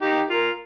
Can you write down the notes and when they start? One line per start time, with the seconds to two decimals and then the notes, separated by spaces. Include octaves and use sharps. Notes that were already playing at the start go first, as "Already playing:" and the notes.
0.01 D#4 G4
0.30 F4 A#4